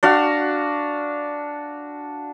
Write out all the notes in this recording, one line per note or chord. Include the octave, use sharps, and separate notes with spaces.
D4 F#4 F5